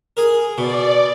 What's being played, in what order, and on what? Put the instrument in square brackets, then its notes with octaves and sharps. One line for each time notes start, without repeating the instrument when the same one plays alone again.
[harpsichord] G#4 A#4
[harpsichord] B2 [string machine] D5